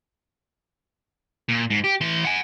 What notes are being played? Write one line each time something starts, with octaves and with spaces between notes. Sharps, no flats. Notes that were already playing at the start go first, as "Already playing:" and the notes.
A#2
G#2
G4
E3 C6
F#5 G#5